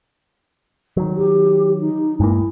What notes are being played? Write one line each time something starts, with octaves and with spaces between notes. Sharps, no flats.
D#3 F#3
G4
D#4
G2 G#3 A#3 E4